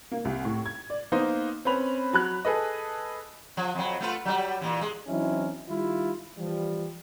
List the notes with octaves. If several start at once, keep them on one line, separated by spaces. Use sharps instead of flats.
A#3
C2
A2
G#6
D5
A#3 B3 D#4 C5
C4 C#4 B4 B5 F7
F#3 B5 F#6
G#4 A4 B4 D#5
F3
F2 F#3
A3 F4 B4
F#3 G3
A#2 E3
G#3
E3 F#3 C4 C#4 D#4 E4
D#3 G3 E4 F4
E3 F3 G3